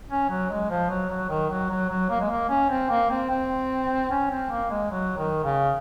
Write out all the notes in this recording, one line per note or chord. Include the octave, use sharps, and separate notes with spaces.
C#4
F#3
G#3
F3
F#3
F#3
D#3
F#3
F#3
F#3
A#3
G#3
A#3
C#4
C4
A#3
C4
C4
C#4
C4
A#3
G#3
F#3
D#3
C#3